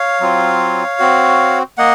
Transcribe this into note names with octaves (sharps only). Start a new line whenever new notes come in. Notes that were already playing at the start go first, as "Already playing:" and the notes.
Already playing: C#5 F5
F#3 C4 F4
C4 F#4
A#3 D#5 F#5